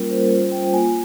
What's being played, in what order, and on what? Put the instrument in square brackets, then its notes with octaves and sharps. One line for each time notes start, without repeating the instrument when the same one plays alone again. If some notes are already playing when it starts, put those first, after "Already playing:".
Already playing: [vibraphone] G3 A#3 C#4 F4 A#4
C5
G3 C#4 F4 C5
G5
A#3 F4 G#5